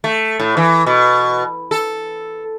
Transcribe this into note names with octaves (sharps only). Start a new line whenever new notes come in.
A3
A2
E3
B2
A4